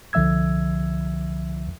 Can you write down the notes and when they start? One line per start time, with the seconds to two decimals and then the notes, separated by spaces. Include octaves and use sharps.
0.13 C2 D3 F3 E5 E6 G#6